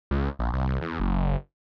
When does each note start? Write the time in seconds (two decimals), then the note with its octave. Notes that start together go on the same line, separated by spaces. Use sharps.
0.11 C#2
0.39 A#1
0.53 C2
0.81 E2
1.00 F#1